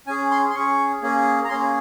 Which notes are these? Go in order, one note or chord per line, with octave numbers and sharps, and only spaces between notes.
C#4 G#4 G#5
C6
C6
C#4 G#4 C#6
A#3 C#4 G#4
A#5
A#3 C#4 G#4 C6